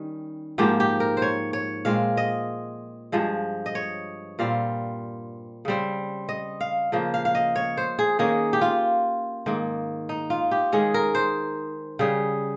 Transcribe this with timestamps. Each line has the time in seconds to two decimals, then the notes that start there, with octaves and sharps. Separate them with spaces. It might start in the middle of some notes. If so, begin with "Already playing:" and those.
Already playing: D#3 G3 C#4
0.58 G#2 F3 A#3 G4
0.80 G4
1.00 A#4
1.17 C5
1.22 C#5
1.53 C#5
1.85 A#2 G#3 C4 F5
2.17 D#5
3.12 G2 F3 G#3
3.66 D#5
3.75 C#5
4.39 A#2 G3 C4 F5
5.65 C#3 G3 C4
6.29 D#5
6.61 F5
6.92 C#3 F3 A#3
7.14 F5
7.25 F5
7.35 D#5
7.56 C#5
7.77 C5
7.99 G#4
8.19 D#3 A#3 C#4 G#4
8.53 G4
8.61 F4
9.46 G#2 D#3 A#3
10.09 D#4
10.30 F4
10.51 G4
10.72 D#3 G#3 C#4 G#4
10.94 A#4
11.15 C5
11.99 C#3 G3 C#4 G#4